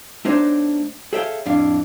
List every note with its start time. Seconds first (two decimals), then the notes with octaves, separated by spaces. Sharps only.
0.25 A3 B3 D4 D#4 C5 C#5
1.13 G#4 A4 C#5 E5 F5 G5
1.46 F2 A2 D4 F5